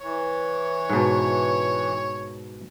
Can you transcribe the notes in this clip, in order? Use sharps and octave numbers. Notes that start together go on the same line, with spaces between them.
E3 C#5
G#2 B2